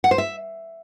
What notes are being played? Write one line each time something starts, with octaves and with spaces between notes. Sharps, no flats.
F#5
C5
E5